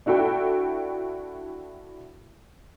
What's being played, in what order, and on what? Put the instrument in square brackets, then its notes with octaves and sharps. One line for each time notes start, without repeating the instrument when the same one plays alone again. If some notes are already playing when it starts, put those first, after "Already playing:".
[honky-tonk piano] D4 E4 F#4 A4 G5